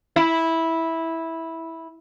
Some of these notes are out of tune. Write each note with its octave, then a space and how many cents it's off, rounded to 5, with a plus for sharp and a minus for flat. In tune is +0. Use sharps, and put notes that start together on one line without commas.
E4 -10